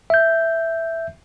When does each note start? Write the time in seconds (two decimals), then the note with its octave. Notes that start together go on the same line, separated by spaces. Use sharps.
0.10 E5 G6